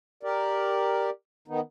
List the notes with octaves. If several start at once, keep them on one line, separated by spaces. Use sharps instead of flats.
G4 A#4 D5
D#3 B3 D#4